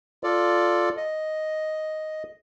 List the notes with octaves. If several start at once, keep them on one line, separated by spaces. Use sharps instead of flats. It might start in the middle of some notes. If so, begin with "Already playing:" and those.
F4 A4 D5
D#5